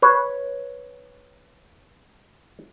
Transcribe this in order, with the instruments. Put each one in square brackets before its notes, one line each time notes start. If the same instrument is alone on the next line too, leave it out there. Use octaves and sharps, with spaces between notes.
[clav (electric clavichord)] B4 C#5